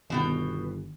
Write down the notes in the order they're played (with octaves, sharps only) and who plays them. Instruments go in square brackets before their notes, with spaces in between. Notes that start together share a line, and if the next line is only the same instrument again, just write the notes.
[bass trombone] G1 [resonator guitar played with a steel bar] B2 B3 G5 [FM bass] D#3